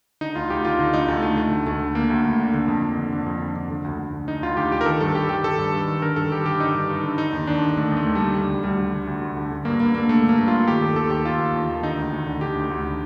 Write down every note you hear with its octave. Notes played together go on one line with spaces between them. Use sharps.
D3 D#4
D2 F4
D2 G4
D3 F4
D3 D#4
D2 D#4
D2 A3
D3 A3
D3 A3
D2
D2 A3
D3
D3 A#3
D2
D2
D3
D3
F2
F2
D3
D3
F2
F2
D3
D3
D2
D2
D3
D3 D#4
D2 F4
D2 G4
D3 G4
A#4
D#3 A4
G2 A4
G2 G4
D#3 G4
D#3 A4
G2
G2
D#3
D3 A#4
G2 A4
G2 G4
D3 G4
D3 D#4
G2
G2
D3
D3 D#4
D#2
D#2 D4
D3
D3 A3
D#2
A3
D#2
G3
D3
D3 G3
D2
D2 G3
D3
D3
D2
D2
D3
D3
G2 A#3
G2 A#3
D3 A#3
D3 A3
G2
A#3
G2
D3 F4
D#3 G4
D#2 A4
D#2 A4
D#3 G4
D#3 F4
D#2
D#2
D#3
D3 D#4
D2
D2
D3
D3 G4
D2
D2
D3